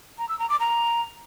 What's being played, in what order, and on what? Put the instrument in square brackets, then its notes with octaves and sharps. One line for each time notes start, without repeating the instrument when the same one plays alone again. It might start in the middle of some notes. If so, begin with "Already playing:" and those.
[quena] A#5
E6
A#5
D6
A#5